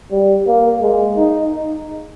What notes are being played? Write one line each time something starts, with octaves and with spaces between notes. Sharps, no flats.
G3
A#3
G#3
D#4